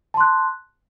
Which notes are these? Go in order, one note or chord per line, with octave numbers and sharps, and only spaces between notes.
A5 C6 F#6